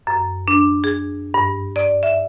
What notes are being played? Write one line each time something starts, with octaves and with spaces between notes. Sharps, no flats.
F#2
D4
G#4
G2
D5
E5